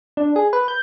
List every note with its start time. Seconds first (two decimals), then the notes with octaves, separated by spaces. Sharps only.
0.17 D4
0.36 G#4
0.53 B4
0.68 G6